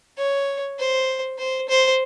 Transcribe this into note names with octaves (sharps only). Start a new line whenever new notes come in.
C#5
C5
C5
C5